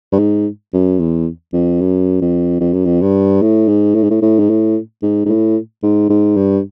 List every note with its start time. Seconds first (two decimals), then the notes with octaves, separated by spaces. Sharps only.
0.12 G2
0.19 G#2
0.74 F#2
0.99 E2
1.53 F2
1.81 F#2
2.21 F2
2.60 F2
2.74 F#2
2.85 F2
3.02 G2
3.42 A2
3.68 G#2
3.95 A2
4.03 G#2
4.10 A2
4.22 A2
4.39 G#2
4.49 A2
5.03 G#2
5.25 G#2
5.29 A2
5.83 G#2
6.09 G#2
6.36 G2